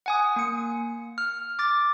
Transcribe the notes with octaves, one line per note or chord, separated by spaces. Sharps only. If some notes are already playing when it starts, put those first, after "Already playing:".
F#5 G#5 D#6
A#3 C#7
F6
D6 A6